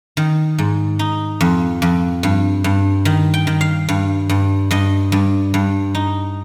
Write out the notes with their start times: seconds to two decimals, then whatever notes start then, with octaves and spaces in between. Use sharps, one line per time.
0.17 D#3
0.58 G#2
0.99 D#4
1.41 F2
1.82 F2
2.23 G2
2.64 G2
3.05 D#3
3.34 G5
3.47 D#3
3.61 F5
3.89 G2
4.29 G2
4.71 G2 D#5
5.12 G2
5.54 G2
5.95 D#4